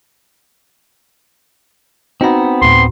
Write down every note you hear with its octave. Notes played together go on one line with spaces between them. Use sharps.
B3 C4 D#4 F#4 A#5
D2 A2 C6